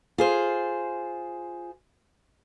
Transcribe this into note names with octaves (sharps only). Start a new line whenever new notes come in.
F4 G#4 C5